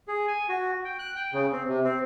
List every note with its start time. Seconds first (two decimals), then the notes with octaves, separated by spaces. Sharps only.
0.08 G#4
0.28 G#5
0.49 F#4
0.85 G5
0.99 F#6
1.16 G5
1.33 C#3
1.52 C4
1.68 C3
1.84 C4